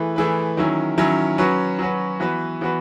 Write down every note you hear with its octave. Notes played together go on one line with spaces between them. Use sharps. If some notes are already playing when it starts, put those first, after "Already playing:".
Already playing: E3 A3 E4 G#4 B4
E3 A3 E4 G#4 B4
D#3 F#3 C#4 E4
D#3 F#3 C#4 E4
F#3 C#4 F#4 B4
F#3 C#4 F#4 B4
E3 B3 F#4 B4
E3 B3 F#4 B4